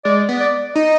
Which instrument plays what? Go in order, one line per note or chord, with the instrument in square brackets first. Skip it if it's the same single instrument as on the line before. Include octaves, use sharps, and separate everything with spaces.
[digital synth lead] G#3 [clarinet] D5
[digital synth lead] B3
[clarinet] D5
[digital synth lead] D#4 [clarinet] D#5